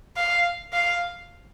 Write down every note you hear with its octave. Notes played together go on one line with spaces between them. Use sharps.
F5
F5